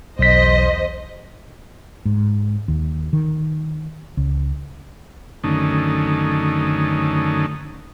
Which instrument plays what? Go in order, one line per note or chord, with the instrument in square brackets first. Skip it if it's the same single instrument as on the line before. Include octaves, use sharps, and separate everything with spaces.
[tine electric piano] B1 B6 [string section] E2 C5 D#5
[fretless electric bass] G#2
D#2
D#3
C#2
[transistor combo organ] F#2 D3 D#3 A3 C#4 D#4